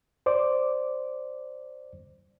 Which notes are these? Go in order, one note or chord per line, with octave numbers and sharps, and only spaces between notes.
C5 D5 D6